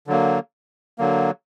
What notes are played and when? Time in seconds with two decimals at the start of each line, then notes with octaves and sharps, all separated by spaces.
0.07 D3 F#3 A#3
0.98 D3 F#3 A#3